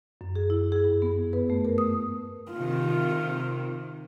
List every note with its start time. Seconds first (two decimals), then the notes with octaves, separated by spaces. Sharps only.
0.21 F#2
0.36 G#4
0.50 E4
0.72 G#4
0.85 G2
1.02 B3
1.33 B4
1.50 A3
1.65 A#4
1.78 D#6
2.52 C3 D#3 F4